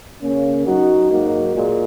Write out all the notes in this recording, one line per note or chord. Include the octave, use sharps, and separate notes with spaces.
C#3 A#3 C#4
F#2 F#3 D#4 F#4
G#2 F#3 A#3 D#4 F#4
A#2 G#3